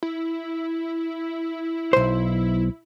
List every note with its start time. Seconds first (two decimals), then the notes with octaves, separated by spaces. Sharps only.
0.03 E4
1.93 B1 C5